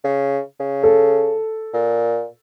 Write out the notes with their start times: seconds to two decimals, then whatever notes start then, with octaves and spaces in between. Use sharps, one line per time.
0.04 C#3
0.60 C#3
0.83 A4
1.74 A#2